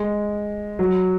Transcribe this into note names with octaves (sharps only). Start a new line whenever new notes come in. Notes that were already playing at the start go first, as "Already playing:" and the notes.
Already playing: G#3
F#3